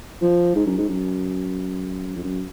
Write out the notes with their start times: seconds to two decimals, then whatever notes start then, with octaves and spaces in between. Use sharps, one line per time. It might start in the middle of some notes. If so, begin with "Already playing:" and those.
0.21 F3
0.55 G#2
0.66 F#2
0.77 G#2
0.89 F#2
2.16 F2
2.23 F#2